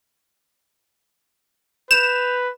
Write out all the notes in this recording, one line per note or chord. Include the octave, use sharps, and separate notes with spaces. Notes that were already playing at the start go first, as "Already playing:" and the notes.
B4 G6 E7 F7